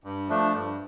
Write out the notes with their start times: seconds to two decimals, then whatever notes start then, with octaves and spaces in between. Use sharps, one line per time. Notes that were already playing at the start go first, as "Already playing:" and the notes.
0.04 G2
0.29 F3 A3 D4
0.52 G2